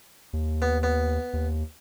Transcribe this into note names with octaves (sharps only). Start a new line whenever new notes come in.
D#2
B3
B3
D#2